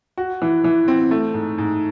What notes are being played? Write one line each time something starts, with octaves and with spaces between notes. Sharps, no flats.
F#4
E3
E3
C4
A3
G#2
G#2